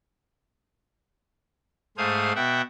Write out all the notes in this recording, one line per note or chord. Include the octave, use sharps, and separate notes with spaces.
G#2 A3 G#4 C5 F5 D#6
B2 E5 F#5 G5